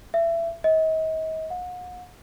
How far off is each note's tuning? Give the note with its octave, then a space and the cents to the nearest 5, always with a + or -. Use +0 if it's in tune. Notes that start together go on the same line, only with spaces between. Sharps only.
E5 +25
D#5 +40
F#5 -40